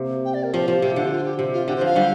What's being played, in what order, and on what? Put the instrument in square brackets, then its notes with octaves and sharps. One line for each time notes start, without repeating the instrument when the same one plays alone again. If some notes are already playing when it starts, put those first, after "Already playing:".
Already playing: [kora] C3 A#3
[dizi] G5
D5
A#4
[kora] F3 [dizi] G4
[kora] F3
[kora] C3 [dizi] G4
[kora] D3 [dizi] F4
[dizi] G4
F4
G4
[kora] C3
[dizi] F4
[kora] D3 [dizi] G4
[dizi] C5
[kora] F3 [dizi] F5
[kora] D3 G3